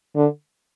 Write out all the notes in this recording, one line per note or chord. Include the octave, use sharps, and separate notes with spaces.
D3